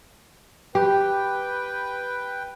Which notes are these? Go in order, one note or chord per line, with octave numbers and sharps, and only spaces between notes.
G4 B4 G5